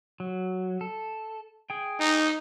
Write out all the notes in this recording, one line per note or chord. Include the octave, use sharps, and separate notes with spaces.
F#3
A4
G#4 G5
D#4